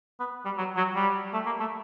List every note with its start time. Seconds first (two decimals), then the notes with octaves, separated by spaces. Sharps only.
0.20 B3
0.45 G3
0.58 F#3
0.77 F#3
0.96 G3
1.33 A3
1.46 A#3
1.60 A3